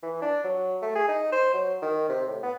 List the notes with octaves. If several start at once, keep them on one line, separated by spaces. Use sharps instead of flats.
E3
D4
F#3
A3
G#4
D#4
C5
F#3
D#3
C3
A2
B3